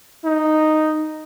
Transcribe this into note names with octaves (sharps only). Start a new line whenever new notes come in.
D#4